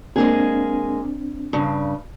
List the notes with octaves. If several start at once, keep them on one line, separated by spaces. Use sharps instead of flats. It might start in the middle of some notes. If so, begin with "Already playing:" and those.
G#3 A#3 C4 D4 G#4
G2 C#3